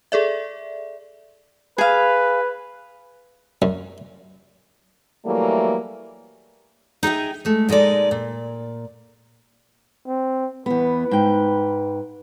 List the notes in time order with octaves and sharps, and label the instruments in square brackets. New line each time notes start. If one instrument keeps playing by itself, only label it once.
[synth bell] G#4 A4 D5 E5
[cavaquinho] G#4 F5 [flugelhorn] B4
[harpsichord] F#2
[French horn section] E3 F#3 G3 A3 A#3
[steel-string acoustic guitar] D#4 G#4 E5 G5
G#3 A3
A#2 G#3 D#4 A4 D5
A#2
[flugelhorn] C4
[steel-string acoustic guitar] E2 B3 [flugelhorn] B4
[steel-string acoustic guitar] G#2 G5